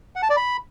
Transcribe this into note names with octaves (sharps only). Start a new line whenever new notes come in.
F#5
A5
D5
B5